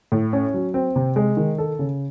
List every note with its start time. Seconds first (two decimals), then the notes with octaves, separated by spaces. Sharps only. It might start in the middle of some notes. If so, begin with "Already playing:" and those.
0.12 A2
0.33 C#4
0.54 F#3
0.74 C4
0.96 C3
1.16 G#3
1.37 D#3
1.58 A4
1.79 C#3